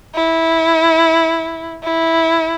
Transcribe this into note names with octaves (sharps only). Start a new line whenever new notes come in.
E4
E4